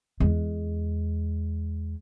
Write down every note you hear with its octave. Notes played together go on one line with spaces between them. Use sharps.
E2 G#3